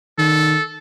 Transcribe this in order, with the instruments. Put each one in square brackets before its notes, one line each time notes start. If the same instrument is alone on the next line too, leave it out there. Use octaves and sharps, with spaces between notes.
[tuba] D#3 [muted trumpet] A4